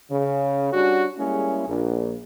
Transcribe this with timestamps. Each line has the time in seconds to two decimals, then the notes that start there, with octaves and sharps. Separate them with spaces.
0.10 C#3
0.73 G3 C#4 D4 F#4
1.18 G3 G#3 A#3 C#4 E4 G#4
1.67 A#1